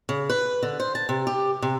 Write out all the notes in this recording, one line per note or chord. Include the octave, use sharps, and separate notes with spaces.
C#3
B4
D3
C5
A5
C3
G4
C3